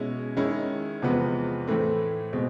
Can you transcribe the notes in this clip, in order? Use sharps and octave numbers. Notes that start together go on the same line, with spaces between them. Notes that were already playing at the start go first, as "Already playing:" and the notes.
Already playing: B2 G#3 C#4 E4
D#3 G#3 C#4 E4
E2 C3 F3 G#3 B3
A2 E3 A3 C4
B2 G#3 C4